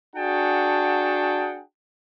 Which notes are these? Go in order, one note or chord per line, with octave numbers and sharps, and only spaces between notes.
D4 F#4 G#4 F#5 G5 A5